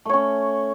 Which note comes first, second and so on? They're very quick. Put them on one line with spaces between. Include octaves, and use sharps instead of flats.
A3 C#5 C#4